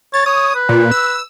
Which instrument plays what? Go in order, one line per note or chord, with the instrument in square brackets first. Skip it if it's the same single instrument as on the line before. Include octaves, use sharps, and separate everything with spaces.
[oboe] C#5 [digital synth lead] A6
[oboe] C#5 [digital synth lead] D#6
[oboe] B4
[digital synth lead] A#2
E6